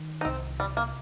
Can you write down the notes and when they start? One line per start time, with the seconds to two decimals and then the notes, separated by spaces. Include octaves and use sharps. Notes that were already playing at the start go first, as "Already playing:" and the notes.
Already playing: D#3
0.21 D#4
0.25 C2 C4
0.59 C3 G3
0.77 A#3